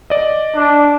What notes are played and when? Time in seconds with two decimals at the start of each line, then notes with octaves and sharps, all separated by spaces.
0.10 D5 D#5
0.56 D4